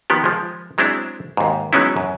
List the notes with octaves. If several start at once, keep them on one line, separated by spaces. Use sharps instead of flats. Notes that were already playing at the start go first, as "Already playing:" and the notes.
D#3 F3 B3 G4
F3 G#3
F#3 G#3 C4 D4 E4
D#2 G#2
F#3 G#3 B3 C#4 D#4 E4
F#2